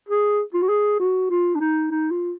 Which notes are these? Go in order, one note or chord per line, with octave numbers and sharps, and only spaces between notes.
G#4
F4
F#4
G#4
F#4
F4
D4
D#4
D#4
F4